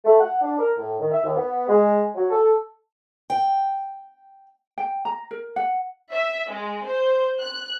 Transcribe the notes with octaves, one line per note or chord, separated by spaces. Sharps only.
A3
F#5
D4
A#4
A2
D#3
E5
D#2
B3
G#3
F#3
A4
G5
G5
A#5
A#4
F#5
E5
G#3
C5
F#6